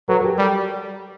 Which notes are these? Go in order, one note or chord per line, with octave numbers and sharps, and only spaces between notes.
F#3 A4 B4
A#4
G4 A4
G3